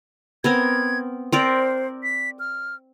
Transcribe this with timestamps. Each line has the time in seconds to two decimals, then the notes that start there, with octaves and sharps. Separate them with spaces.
0.44 B3 C4 A#4 G#6
1.32 C4 A#4 C5 D5
2.03 B6
2.39 F6